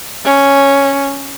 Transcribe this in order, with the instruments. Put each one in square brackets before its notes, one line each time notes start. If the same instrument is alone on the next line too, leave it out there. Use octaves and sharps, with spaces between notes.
[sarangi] C#4